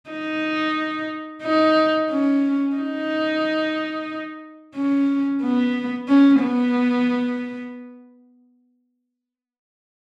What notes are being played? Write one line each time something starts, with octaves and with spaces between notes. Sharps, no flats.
D#4
D#4
C#4
D#4
C#4
B3
C#4
B3